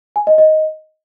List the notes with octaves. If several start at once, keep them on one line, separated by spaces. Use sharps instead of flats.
G#5
D#5
D#5